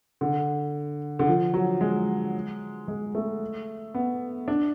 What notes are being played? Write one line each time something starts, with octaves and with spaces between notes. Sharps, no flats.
D3
D3
F3
F#3
G#3
G#3
A3
B3
D4